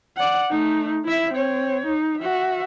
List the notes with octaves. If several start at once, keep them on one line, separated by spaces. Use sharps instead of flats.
D5 F#5
A3 D#4
E4 E5
C4 C#5
D#4
F#4 E5